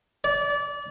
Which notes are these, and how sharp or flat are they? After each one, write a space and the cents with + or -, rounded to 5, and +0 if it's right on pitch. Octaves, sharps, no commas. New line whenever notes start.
D5 -25